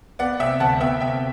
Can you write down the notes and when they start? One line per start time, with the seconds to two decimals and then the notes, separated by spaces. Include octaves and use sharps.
0.19 B3 D5 F#5
0.40 C3 E5 G5
0.60 D2 F#5 A5
0.80 B3 E5 G5
1.00 C3 E5 G5